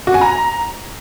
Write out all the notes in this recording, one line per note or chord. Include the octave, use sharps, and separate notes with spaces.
F#4
G#5
A#5